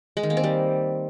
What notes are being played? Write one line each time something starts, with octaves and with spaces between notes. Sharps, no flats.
G#3
D#3
A#3
C4
G3